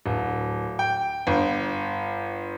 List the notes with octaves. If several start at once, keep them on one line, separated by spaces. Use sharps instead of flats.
D1
G5
G1